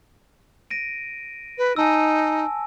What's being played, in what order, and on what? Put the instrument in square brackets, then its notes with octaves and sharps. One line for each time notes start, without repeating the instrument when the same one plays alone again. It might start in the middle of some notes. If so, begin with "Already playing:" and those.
[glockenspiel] A#6 D7 D#7
[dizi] B4
[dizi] D#4 [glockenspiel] G#5 A5 E6